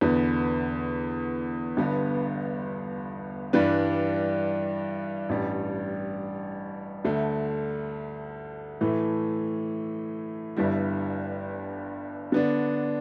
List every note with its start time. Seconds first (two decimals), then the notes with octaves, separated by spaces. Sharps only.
0.01 E2 D3 B3
1.77 G1 G2 D3 B3
3.53 G2 E3 G3 D4 B4
5.29 A1 G2 G3
7.05 D2 D3 A3
8.81 A2 E3 A3
10.57 G1 G2 G3 E4
12.32 D3 B3 D4